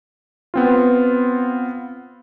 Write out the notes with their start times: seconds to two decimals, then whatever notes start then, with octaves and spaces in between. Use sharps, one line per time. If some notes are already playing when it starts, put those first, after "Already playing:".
0.54 B3 C4 F4